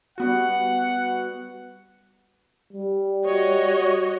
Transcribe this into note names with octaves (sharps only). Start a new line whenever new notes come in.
G3 B3 F#4 F#5
G3
F#4 C#5 D#5